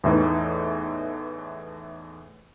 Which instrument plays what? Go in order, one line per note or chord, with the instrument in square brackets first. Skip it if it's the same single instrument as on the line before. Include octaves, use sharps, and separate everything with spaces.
[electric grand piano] E2 A2 E3 D#4